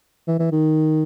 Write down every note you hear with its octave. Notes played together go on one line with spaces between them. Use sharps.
E3
E3
D#3